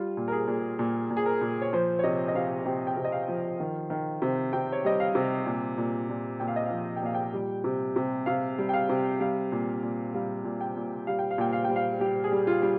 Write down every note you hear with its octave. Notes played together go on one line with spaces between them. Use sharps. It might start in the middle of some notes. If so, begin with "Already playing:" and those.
Already playing: G3 F4
A#2
A#4
G#4
A#2
A#2
A#2
G#4
A#4
A#2
C#5
F3 C5
C#5
C3 D#5
D#5
C3 F5
C3 G5
G5
C3
D#5
F5
F3
D#3
D#3
C3
C3 G5
C#5
G3 D#5
F5
C3
A#2
A#2
A#2
A#2 G5
F5
D#5
F3 F5
G5
A#2 F5
G5
G3
C3
C3
C3 F5
G3
G5
F5
C3
G3 F5
A#2
A#2
G3 F5
A#2
G5
A#2
G3 F5
G5
F5
A#2 G5
F5
G3 G5
F5
G3 G4
G#4
G3
F4
G3